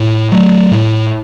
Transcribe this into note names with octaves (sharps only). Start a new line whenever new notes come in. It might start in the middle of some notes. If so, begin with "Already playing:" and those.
Already playing: A2
F#3 A3
A2